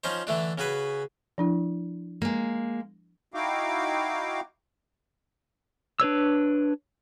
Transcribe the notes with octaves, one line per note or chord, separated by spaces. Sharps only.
F3 C#4 D#4 C5
D3 E3 A3 D4
C#3 F#4 G#4 B4
F3 D4 E4
G#3 A#3
D#4 E4 F#4 F5 G5 D6
D4 B4 C#5 E6